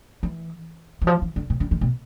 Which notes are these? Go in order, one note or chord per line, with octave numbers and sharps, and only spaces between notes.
E3
E3
F3
E3
D3
B2
D3
D#3
B2